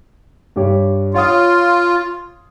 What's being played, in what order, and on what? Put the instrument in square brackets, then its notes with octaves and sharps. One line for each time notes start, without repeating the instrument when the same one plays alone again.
[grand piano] G2 G4 C#5
[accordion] F4 [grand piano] C#5 F5 D#6